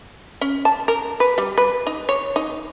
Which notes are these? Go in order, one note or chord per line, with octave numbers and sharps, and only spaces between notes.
C#4
A5
A#4
B4
G3
B4
D#4
C#5
D#4